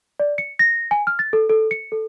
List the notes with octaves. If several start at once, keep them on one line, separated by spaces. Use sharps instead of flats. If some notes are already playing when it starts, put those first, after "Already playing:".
D5
C#7
A#6
G#5
F6
A6
A4
A4
C#7
A4